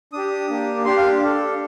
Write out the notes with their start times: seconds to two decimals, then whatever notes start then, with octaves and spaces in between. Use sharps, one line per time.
0.13 D4 G4 D#6
0.49 A#3 D4 G4
0.85 D4 G4 C6
0.97 F5
1.22 D4 A4